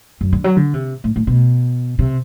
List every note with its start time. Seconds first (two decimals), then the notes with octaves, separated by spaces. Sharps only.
0.21 F#2
0.33 D3
0.44 F#3
0.56 D3
0.74 C3
1.04 A2
1.16 A2
1.27 B2
1.99 C3